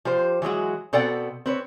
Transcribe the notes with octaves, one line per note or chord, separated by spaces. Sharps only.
F3 G4 C5
E3 F#3 G#3 F#4
B2 C4 A4 D5 F#5 G5
C4 B4 C#5